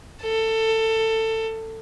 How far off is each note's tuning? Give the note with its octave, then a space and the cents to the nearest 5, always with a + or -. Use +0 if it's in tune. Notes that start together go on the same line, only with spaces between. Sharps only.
A4 +20